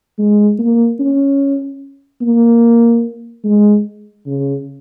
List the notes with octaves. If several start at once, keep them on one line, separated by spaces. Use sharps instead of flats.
G#3
A#3
C#4
A#3
G#3
C#3